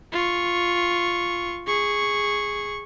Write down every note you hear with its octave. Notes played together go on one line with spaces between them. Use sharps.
F4 C#6
G#4 C#6